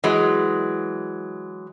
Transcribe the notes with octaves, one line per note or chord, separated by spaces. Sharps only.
E3 F#3 G#3